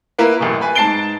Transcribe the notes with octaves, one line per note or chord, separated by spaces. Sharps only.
A#3 E4 A#4 B4
A1 F#2 B2
B4 G#5 B5
G#2 A5 A6 C7 D7 G7